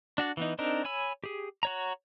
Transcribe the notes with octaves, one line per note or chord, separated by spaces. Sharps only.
D4 F#4 D5
E3 B3 D#4
C4 D4 D#4 A#4
C#5 G#5 B5 E6
G4 G#4
F#4 C#5 A#5